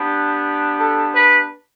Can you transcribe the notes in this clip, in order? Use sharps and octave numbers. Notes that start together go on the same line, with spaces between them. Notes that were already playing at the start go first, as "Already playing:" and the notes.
Already playing: B3 D4 G4
A4
B4